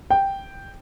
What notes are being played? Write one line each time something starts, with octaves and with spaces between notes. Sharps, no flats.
G5